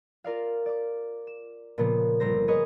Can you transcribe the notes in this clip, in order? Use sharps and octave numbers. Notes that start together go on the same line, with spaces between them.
F4 A#4 D5 F5
D5 D6
E7
A#2 C#3 F3 A#3 B3
G1 C4 A#4 C5 A#6
G#4 A#4 B4 C#5 D#5